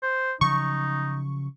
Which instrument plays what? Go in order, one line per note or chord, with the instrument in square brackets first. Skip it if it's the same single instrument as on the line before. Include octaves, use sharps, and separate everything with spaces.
[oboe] C5
[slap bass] C#3 F3 F#3 [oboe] D#4 [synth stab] C#6